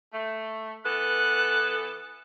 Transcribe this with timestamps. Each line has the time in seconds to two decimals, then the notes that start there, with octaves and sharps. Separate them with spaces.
0.13 A3
0.84 E3 B3 A4 F#6